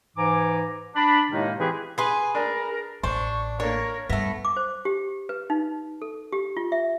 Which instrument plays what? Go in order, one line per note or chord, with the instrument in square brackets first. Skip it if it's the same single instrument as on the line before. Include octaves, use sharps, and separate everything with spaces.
[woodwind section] G#2 E3 G#5 A#5 D6
D4 B5
A2 C3 D#3 G#3 A#3 D#4
E3 C4 E4 G4 G#4 B4
[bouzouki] G#4 B4 [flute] G#5 [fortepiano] C6
[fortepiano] D4 [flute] A#4
[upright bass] A1 [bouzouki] D4 [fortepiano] C5 [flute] C#6
[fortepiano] A#3 D4 [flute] A#4 [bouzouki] C#5
[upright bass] G2 [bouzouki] A3 B3 [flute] A#6
[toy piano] D6
C5
G4
B4
D#4
A4
G4
F4
E5